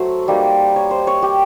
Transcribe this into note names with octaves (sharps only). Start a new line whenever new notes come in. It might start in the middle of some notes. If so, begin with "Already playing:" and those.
Already playing: F#3 A3 C5
G3 A#3 D#4
C#5
C5
C#5
G4